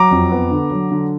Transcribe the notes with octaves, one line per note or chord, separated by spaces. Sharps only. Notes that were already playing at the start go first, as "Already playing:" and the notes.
Already playing: F#3 A#5 D6
F2
B3
D3
F#3
D3